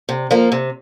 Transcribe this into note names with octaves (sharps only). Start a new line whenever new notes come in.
C3
F3 A#3 F4 A#4
C3